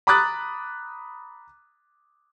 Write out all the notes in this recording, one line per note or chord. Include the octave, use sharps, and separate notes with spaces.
A#5 B5 D6 D#6 F#6 A6